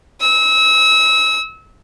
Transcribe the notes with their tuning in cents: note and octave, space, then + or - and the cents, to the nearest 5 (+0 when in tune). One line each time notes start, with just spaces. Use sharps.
E6 -30